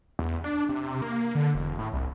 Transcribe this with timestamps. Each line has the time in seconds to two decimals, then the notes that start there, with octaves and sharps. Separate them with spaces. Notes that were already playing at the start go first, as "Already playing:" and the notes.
0.19 E2
0.44 D4
0.69 C3
1.02 A#3
1.35 D3
1.55 E1
1.79 A2
1.93 C2